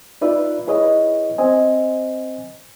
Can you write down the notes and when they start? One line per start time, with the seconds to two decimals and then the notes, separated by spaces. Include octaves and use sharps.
0.21 D#4 F4 B4 D5 E5
0.67 E4 G#4 B4 C#5 D#5 F5
1.38 C4 C5 D#5 G#5